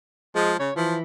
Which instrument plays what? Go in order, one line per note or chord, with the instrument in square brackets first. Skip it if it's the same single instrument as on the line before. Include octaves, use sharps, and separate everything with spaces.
[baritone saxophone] F3 [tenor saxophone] G#3
[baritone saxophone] C#3 [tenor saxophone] C#5
[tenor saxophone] E3 [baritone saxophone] F3